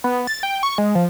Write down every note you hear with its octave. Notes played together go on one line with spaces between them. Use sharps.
B3
A6
G5
C#6
G#3
F3